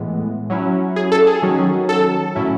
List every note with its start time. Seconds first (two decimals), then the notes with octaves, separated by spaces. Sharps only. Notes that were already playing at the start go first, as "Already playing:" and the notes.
Already playing: A2 E3 G#3 B3
0.50 F#3 C#4 E4
0.96 G#4
1.12 A4
1.27 G#4
1.42 D#3 F#3 C#4
1.89 A4
2.35 A2 F#3 C#4 E4